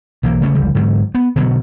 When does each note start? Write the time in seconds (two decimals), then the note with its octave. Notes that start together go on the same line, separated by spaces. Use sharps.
0.23 B1 E3 A#3
0.41 C#3 A3 C#4
0.55 F1 C#2 D3 G3
0.75 G#2 D3 F#3
1.15 B3
1.36 B2 D3 E3 F#3